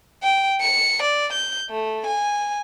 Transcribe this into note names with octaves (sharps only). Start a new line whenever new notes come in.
G5
C#7
D5
G6
A3
G#5